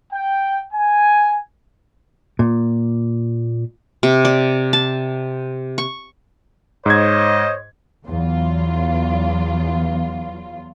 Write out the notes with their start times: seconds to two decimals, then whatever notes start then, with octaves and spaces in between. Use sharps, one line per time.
0.13 G5
0.74 G#5
2.39 A#2
4.03 C3
4.25 D5
4.73 A5
5.78 C#6
6.86 G#2 C5 C#5 D#5 G#6
8.06 E2 F#3 F4